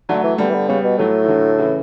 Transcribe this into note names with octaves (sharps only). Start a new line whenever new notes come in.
D3 F#3 A3
E3
D3 G3 B3
E3
D3
C#3 G3 B3
B2
A2 F#3 A3
E3
D3 F#3
C#3 E3